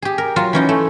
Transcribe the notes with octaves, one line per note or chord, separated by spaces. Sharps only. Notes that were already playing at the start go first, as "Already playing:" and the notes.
G4 G#4
A#4
F#3 F4
E3 C#4 D#4
A3